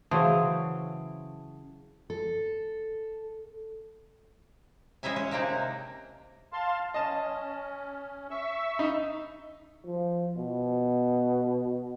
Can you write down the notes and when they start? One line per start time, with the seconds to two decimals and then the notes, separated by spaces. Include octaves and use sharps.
0.11 C#3 E3 F#3 C5 A5 D#6
2.10 A4
5.03 G#3 C#4 E4 E5 G#5
5.16 C#4
5.31 C3 G#3 A#3 D4 D#4
6.53 F5 A5 C6
6.94 C#4 D#5 A5
8.30 E5 C#6 E6
8.79 D#4
9.86 F3
10.37 B2